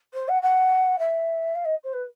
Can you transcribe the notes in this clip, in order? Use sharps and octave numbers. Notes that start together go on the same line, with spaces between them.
C5
F#5
F#5
E5
F5
D#5
C5
B4